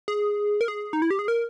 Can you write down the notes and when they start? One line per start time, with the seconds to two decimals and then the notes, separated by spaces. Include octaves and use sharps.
0.08 G#4
0.61 A#4
0.68 G#4
0.93 D#4
1.02 E4
1.11 G4
1.19 G#4
1.28 A#4